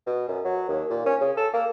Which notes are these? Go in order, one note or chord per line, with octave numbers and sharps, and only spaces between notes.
B2
F#2
F#3
D#2
A#2
C#4
C#3
A4
A#3